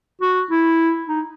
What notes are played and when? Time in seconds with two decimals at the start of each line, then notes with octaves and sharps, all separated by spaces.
0.22 F#4
0.51 E4
1.07 D#4